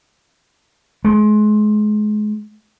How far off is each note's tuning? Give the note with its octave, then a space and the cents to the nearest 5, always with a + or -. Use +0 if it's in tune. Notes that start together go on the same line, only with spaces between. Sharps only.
G#3 +30